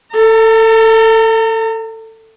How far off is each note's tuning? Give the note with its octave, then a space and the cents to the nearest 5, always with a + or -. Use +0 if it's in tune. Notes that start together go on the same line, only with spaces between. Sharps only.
A4 +20 A#5 -40